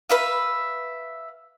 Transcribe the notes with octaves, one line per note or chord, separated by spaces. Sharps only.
B4 E5 F5